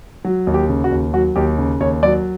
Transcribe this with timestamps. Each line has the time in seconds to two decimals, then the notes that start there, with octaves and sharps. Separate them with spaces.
0.25 F#3
0.47 D#2
0.54 G4
0.69 C#3
0.84 F#4
0.91 D#2
1.14 F#3 F#4
1.36 D#2 G4
1.58 C#3
1.80 D#2 C#5
2.03 F#3 D5